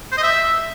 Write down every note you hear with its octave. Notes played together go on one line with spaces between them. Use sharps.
C5
D#5
E5